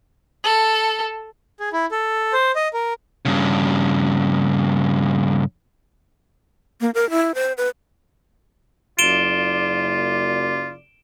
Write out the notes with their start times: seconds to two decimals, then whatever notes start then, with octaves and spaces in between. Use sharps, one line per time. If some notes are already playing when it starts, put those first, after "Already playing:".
0.44 A4
1.60 G#4
1.73 E4
1.91 A4
2.33 C5
2.55 D#5
2.74 A#4
3.25 G2 C#3
6.81 A#3
6.94 A#4
7.11 E4
7.35 C5
7.58 B4
8.99 F#1 F4 D5 D7 E7 G7